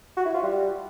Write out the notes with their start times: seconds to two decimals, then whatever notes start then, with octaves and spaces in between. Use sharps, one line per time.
0.17 F#4
0.25 E4
0.34 F4
0.43 G3